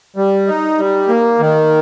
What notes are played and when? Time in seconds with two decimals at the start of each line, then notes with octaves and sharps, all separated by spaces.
0.16 G3
0.47 D#4
0.78 G3
1.08 A#3
1.39 D#3